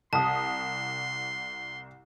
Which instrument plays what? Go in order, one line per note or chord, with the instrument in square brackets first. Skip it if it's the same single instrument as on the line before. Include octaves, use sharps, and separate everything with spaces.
[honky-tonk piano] C2 D#6 [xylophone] A5 [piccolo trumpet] C6